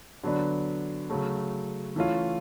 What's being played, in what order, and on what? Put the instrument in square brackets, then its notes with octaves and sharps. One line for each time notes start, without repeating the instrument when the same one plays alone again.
[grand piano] D3 F#3 B3 D4
C#3 F#3 A3
E3 A3 C#4 F4